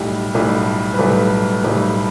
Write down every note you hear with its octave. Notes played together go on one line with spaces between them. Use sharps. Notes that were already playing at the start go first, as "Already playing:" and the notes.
Already playing: B1 A2 G3 G4
B1 A2 G3
B4
B1 A2 G3 A4
B1 A2 G3